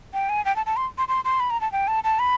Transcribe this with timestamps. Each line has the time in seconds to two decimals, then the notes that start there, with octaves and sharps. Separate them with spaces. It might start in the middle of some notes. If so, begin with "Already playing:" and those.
0.14 G5
0.29 G#5
0.45 G5
0.56 A5
0.66 A5
0.77 C6
0.98 C6
1.08 C6
1.25 C6
1.40 B5
1.50 A#5
1.61 A5
1.72 G5
1.88 A5
2.04 A5
2.19 B5